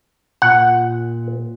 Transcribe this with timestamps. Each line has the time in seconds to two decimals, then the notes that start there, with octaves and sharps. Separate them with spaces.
0.42 A#2 F#5